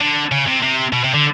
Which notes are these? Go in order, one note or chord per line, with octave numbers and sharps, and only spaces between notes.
D3
C#3
C3
C3
B2
C3
D3